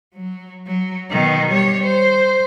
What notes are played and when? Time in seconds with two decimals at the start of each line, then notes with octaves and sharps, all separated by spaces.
0.15 F#3
0.67 F#3
1.10 B2 D#3
1.51 G3 C#5
1.83 C5